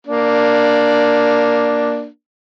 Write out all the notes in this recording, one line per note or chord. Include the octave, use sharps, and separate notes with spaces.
A#3 D4